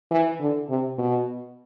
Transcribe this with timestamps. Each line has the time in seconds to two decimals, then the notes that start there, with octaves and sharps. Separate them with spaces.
0.11 E3
0.40 D3
0.70 C3
0.98 B2